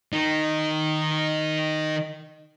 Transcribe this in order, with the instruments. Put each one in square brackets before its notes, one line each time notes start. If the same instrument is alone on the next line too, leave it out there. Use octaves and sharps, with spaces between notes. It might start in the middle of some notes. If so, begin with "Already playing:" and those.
[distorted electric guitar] D#3 D#4